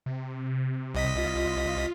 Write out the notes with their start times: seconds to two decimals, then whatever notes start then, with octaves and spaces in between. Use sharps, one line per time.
0.06 C3
0.94 C2 D#5 B6
1.18 F4